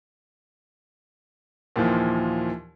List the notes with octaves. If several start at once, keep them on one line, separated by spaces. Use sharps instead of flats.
D#2 A#2 E3 F3